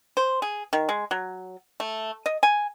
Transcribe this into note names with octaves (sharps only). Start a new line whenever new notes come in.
C5
G#4
D#3
G#3
F#3
A3
D#5
G#5